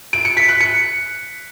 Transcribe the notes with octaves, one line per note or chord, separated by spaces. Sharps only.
D7
C#7
B6
F#6
C#7